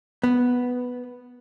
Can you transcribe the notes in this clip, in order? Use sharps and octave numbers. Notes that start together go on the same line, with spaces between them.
B3